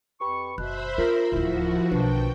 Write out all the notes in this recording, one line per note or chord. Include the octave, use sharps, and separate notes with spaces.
F2 G4 B4 B5 C#6
F#1 B2 C5 E5 B5 F#6
D4 F4 A#4
D1 D#2 F3 E4 F#4 A#4
B1 D#3 F3 D4 B4 G5 C#6